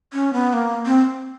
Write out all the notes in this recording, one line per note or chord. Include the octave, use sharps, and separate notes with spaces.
C#4
B3
A#3
C4